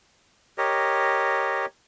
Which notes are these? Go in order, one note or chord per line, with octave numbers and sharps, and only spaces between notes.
G4 A#4 C#5 D#5